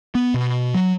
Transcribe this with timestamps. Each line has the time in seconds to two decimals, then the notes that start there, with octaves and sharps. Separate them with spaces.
0.15 B3
0.34 B2
0.74 F#3